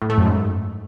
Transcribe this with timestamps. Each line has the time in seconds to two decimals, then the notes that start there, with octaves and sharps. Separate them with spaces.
0.02 A2
0.10 A3
0.18 F#2
0.26 G#2